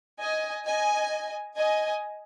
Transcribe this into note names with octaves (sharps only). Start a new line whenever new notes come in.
D#5 G#5
D#5 G#5
D#5 G#5